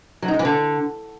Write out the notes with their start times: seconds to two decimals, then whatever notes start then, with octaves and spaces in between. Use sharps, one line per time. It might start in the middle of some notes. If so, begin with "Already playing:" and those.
0.22 F#3
0.28 D#4
0.34 G#3
0.39 E3
0.45 D3